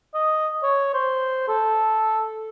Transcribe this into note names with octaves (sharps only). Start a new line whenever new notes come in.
D#5
C#5
C5
A4